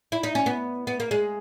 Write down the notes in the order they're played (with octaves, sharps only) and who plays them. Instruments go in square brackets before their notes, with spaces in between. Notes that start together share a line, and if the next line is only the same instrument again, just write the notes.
[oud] E4
D#4
C#4
B3
B3
A#3
G#3